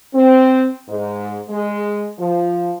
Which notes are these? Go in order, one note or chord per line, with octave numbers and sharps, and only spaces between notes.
C4
G#2
G#3
F3